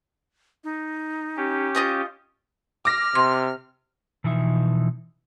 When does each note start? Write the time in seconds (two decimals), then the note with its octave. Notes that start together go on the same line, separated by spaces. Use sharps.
0.64 D#4
1.37 C#4 G4
1.75 F4 D#5 D#6
2.85 D6 F6 A#6
3.15 C3 C6
4.24 B2 E3 F3 D#4 E5